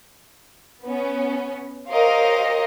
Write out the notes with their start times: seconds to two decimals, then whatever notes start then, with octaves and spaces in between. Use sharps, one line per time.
0.83 B3 C#4
1.90 G4 A#4 C5 C#5 D#5 F5